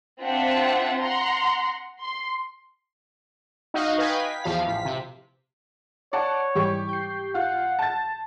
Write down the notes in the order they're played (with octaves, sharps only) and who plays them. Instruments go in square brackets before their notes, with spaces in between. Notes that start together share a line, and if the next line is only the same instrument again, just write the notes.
[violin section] C4 D4 F4 C5 E5 F#5
F#5 A#5 C6
C6
[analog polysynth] D#4 F#4 D#5 F5
B4 D#5 F5 G5 G#5 B5
B6
E2 F3 F5
A1 B6
C3
[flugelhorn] C#5 [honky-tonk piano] D5 F#5 A5
[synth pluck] G#2 E3 G3 [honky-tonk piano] G4 C#6
[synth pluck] G6 C7
[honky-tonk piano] F4 [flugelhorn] F#5
[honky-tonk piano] A5 A6